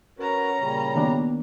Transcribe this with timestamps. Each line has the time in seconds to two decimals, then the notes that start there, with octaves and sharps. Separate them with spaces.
0.19 C#4 F#4 A#4 B4 A#5
0.59 A#2 C#3 G3
0.96 B2 D#3 A#3 D4